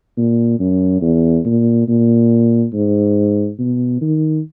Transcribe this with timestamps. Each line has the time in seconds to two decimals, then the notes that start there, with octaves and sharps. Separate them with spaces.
0.17 A#2
0.59 F#2
1.02 E2
1.45 A#2
1.88 A#2
2.74 G#2
3.59 B2
4.01 D#3